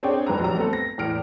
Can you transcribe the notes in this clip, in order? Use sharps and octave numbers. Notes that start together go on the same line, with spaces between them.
C4 D4 G#4 C#5 D5 G5
F2 D#3 B4 A#5
A#1 F#3 G3 A#5
A3 B3 C4 A4
A#6
E2 A2 F6 D7